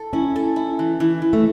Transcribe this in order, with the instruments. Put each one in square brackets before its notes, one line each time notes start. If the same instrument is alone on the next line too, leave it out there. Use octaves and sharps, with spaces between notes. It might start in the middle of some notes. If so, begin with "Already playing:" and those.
Already playing: [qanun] A4
[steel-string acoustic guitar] C#4 [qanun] E4
[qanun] A4
E4
E3
E3
E3
[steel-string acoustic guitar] A3